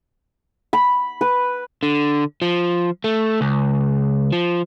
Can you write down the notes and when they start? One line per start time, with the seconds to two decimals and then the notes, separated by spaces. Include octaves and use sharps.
0.73 B5
1.21 B4
1.83 D3
2.42 F3
3.04 A3
3.41 C#2
4.32 F3